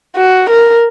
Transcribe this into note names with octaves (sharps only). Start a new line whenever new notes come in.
F#4
A#4